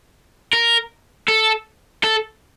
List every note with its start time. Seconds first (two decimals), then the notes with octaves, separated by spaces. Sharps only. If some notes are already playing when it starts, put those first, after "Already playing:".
0.53 A#4
1.28 A4
2.04 A4